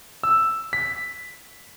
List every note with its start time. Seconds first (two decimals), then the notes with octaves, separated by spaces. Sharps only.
0.23 E6
0.73 B6